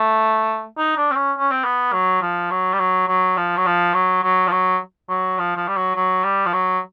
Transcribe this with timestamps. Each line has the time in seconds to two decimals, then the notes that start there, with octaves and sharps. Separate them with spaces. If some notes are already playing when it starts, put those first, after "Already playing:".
Already playing: A3
0.77 D#4
0.97 D4
1.11 C4
1.15 C#4
1.38 C#4
1.51 C4
1.64 B3
1.92 F#3
2.21 F3
2.51 F#3
2.73 G3
2.79 F#3
3.08 F#3
3.37 F3
3.57 F#3
3.66 F3
3.94 F#3
4.23 F#3
4.47 F3
4.51 F#3
5.09 F#3
5.38 F3
5.56 F3
5.68 G3
5.76 F#3
5.96 F#3
6.24 G3
6.45 F3
6.53 F#3